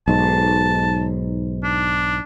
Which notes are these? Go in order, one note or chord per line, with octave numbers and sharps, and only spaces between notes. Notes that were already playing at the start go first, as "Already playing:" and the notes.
B1 G#2 A5
D4